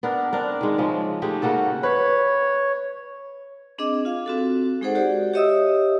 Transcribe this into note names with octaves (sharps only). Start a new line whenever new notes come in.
B3 D4 A#4
C4 D4 A#4
D#3 G#3
C#3 F3 G#3
G#3 A3 D#4 G4
C#3 A#3 F#4 A4
B4 C#5
C4 D4 G#4 D#5 D6
F4 F5
C4 F#4 A4
G#3 D#4 G#4 A4 C5 F#5
F#4 G4 D5
G4 C#5 D#5 E5 D#6 E6